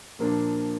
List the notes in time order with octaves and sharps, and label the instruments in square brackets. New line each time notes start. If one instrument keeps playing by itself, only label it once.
[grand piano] A#2 F3 A#3 D4